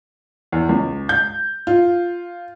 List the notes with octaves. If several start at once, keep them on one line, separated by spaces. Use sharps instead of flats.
E2
C#2
G6
F4